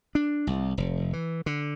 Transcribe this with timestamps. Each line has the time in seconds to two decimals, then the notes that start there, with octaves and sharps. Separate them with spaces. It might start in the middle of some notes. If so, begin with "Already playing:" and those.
0.15 D4
0.47 C2
0.78 F1
1.13 E3
1.46 D3